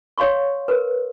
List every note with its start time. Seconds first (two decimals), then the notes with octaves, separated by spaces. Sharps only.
0.18 C#5 F5 C6 C#6
0.68 A#4 B4